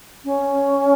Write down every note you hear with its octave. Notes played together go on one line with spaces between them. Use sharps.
C#4